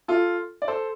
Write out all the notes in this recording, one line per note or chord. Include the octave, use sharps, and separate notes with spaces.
F4 A4
D5
A4 C5